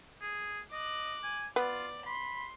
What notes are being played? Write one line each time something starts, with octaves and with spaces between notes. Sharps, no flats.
G#4
D#5 D6 F#6
G#5
B3 F4 D5
B5 C6